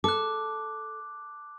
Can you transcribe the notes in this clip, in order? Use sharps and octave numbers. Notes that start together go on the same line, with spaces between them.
A4 D6 F#6